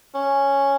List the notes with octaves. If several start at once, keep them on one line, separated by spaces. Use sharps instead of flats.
C#4